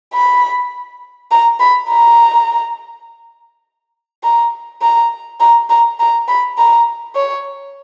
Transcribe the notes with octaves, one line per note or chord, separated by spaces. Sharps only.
B5
A#5
B5
A#5
A#5
A#5
A#5
A#5
A#5
B5
A#5
C#5